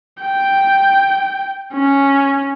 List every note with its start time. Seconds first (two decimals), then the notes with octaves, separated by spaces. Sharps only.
0.23 G5
1.73 C#4